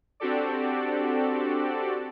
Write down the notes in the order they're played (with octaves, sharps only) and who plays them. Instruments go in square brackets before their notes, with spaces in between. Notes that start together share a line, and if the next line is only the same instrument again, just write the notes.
[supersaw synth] C4 D4 F#4 G4 A4 D5